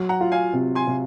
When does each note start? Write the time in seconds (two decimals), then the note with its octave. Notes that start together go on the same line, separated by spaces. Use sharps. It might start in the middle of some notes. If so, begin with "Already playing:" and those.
Already playing: F#3
0.09 F#5 A#5
0.21 F4
0.32 F5 G#5
0.53 C3
0.75 G#5 C6
0.87 C3